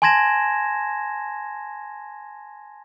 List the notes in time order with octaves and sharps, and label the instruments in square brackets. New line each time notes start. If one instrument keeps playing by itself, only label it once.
[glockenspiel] G#5 A5 C6 G#6 A#6 E7